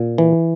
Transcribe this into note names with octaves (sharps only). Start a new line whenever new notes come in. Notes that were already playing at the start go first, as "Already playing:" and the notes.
Already playing: A#2
E3